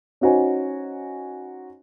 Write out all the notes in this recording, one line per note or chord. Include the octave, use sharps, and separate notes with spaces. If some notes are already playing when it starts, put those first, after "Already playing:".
C#4 D#4 F#4 C5 G#5